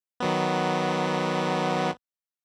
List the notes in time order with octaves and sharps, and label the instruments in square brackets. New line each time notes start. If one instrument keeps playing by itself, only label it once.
[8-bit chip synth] D#3 F#3 B3